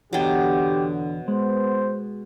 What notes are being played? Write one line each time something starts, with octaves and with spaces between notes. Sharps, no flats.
E2 B2 D3 F#3 G4 G5
G#3 B3 C5